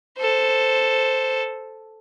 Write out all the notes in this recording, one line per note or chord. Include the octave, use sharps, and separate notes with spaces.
A4 C5